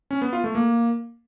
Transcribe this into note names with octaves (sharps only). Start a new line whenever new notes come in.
C#4
B3
F4
A3
A#3